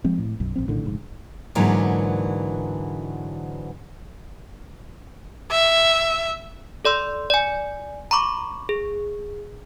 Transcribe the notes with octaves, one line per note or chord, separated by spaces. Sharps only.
F3 G#3 C4
A2
B1 F#2
A#1 F3 C4
A#1 A2 D3 D#3
F1 G#2
G#2 D3 E3 F#3 A#3
E5
A4 D5 C6 E6
D5 G#5
A#5 B5 C#6 D6
G#4